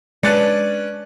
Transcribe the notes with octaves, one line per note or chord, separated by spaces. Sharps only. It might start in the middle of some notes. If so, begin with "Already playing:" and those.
G#3 C#4 D4 B4 D5 F#6 A6 C#7